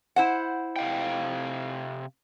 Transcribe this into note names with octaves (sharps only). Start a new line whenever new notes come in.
E4 C5 F#5
C3 F5 G5